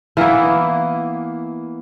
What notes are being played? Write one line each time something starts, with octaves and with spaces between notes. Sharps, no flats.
E3 A#3 B3 E4